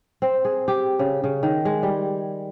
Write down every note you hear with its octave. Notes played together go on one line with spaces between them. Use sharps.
C4
G#4
G4
C#3
C#3
D#3
G#3
G3